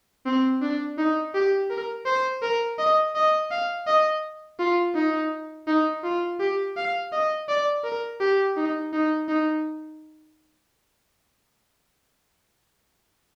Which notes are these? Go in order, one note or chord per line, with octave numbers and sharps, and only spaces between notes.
C4
D4
D#4
G4
A#4
C5
A#4
D#5
D#5
F5
D#5
F4
D#4
D#4
F4
G4
F5
D#5
D5
A#4
G4
D#4
D#4
D#4